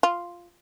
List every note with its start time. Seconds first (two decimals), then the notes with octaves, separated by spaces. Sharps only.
0.03 F4